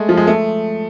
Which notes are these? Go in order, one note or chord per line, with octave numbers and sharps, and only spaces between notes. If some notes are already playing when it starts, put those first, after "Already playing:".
Already playing: G#3 A3
F3
G#3
A3